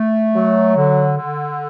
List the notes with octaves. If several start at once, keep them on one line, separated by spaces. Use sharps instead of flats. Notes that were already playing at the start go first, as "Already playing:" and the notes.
Already playing: A3
F#3
D3
D3